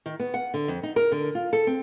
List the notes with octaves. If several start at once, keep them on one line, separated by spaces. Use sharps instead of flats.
D#3
B3
F#5
D3
F2
D#4
A#4
D3
F4
A4
C4